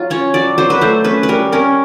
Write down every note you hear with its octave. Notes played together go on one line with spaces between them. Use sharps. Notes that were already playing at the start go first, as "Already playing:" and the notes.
Already playing: F#3 F4
C#4 C#5
F#3 D5
F#3 C5
B4
A3 C5
C#4 B4
B4
G3 A#4
C#4 A#4